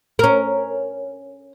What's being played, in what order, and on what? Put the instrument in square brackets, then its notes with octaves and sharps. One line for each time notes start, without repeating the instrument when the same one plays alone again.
[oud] C#4 A#4